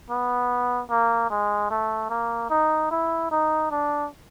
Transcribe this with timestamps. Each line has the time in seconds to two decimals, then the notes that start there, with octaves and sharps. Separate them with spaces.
0.10 B3
0.90 A#3
1.30 G#3
1.70 A3
2.10 A#3
2.50 D#4
2.91 E4
3.31 D#4
3.71 D4